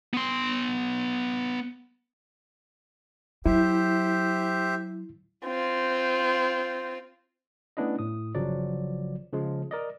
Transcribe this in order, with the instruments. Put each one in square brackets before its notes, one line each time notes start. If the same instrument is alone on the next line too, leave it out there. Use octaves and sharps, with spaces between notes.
[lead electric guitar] B3 C6
[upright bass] F#3 [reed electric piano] E4 [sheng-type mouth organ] G4 C5 E5
[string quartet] C4 F4
[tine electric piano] A3 B3 C#4 D4 E4 D#5
A2 D#6
G1 C#3 F3 F#3 D5
C#3 F3 G#3
A#4 D5 D#5